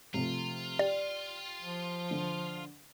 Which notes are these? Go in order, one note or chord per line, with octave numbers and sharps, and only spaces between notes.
C3 F3 A3 F4
G4 D5
F3
D3